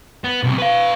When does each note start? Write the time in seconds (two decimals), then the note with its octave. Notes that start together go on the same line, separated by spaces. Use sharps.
0.24 B3
0.43 B1 C3
0.58 B4 F5